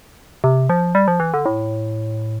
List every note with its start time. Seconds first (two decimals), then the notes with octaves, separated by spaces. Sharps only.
0.44 C3
0.69 F3
0.95 G3
1.08 F3
1.20 E3
1.34 D3
1.46 A2